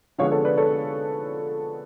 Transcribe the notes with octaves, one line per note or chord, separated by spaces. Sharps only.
D3 F3 G#3 B3 C#5 F5
A4 C#5
B4 D5
A4 C#5